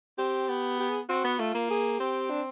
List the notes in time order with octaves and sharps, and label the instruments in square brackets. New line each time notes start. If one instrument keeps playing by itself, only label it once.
[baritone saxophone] C4 [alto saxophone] G4
[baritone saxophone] B3
[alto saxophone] G4
G#4
[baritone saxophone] C4 [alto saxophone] F#4
[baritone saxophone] B3
[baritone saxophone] A3 [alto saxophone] F4
[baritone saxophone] A#3
[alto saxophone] G#4
[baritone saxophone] C4 [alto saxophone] G4
[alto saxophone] D4